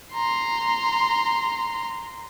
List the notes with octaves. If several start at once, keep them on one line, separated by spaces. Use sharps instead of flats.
A#5 C6